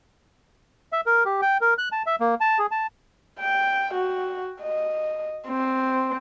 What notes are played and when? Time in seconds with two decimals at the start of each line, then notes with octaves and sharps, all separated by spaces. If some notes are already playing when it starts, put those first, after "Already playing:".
0.93 E5
1.06 A#4
1.26 G4
1.42 G5
1.61 A#4
1.78 F#6
1.92 A5
2.06 E5
2.20 A#3
2.41 A5
2.59 G#4
2.71 A5
3.40 G5
3.94 F#4
4.62 D#5
5.48 C4